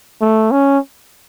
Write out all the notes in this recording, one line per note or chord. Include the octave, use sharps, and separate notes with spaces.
A3
C#4